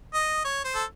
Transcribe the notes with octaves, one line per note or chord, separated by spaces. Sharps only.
D#5
C#5
C5
A4